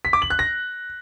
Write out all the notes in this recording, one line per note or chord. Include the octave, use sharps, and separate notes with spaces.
B6
D6
F#7
F#6
A#6